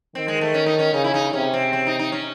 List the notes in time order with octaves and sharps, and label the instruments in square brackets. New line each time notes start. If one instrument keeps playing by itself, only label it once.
[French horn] D#3 [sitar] C4
[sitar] G#3
A3
C#4
D#4
C#4
[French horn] C#3 [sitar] D#4
[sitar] E4
D#4
[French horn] C3 [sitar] C#4
[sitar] C4
C4
D#4
D#4
C#4